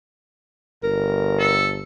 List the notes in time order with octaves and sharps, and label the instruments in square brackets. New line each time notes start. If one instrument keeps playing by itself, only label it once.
[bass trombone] G1 [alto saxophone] A#4
[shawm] A4